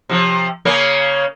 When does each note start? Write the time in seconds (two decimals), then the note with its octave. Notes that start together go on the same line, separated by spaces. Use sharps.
0.09 C3 F3
0.65 C#3 A#3 C#4